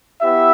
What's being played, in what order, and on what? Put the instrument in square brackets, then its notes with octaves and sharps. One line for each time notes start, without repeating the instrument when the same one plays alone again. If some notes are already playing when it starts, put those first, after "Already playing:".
[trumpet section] B3 E4 G4 E5